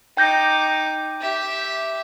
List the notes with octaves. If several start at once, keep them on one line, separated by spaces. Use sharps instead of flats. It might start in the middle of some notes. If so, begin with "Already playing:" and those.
D#4 G5 D6 G6 A#6
G4 E5